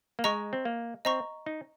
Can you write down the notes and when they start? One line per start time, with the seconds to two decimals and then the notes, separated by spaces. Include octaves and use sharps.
0.19 A#3
0.24 G#3 D#5 A#5 C#6
0.53 C4
0.65 A#3
1.05 C4 D#5 A#5 C#6
1.46 D#4